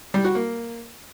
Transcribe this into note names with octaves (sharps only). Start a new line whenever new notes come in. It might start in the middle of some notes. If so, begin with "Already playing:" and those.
G3
F#4
A#3